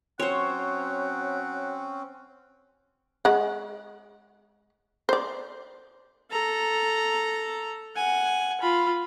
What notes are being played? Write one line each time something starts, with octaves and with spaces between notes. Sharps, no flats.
F#3 C4 C#4 C5 C#5 F#5
G#3 F#5
C5 D5
A4 A#5
F#5 G#5
F4 B5